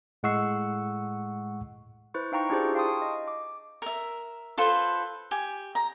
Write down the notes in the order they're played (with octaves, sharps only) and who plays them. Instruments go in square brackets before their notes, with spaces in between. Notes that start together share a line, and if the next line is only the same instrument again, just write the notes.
[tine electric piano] A2 G#3 F#5 C#6 E6 C7
[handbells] E4 B4 C5 C#6
D#4 F5 G5 A#5 C#6
D4 E4 F4 G4 G#4 C5
F5 G5 A5 C6 C#6 D#6
D#5
D6
[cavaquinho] A#4 E5
F4 A4 B4 C5
G4 G#5
A#5